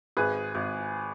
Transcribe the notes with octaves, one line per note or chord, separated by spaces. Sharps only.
G#1 G#4 B4
G#1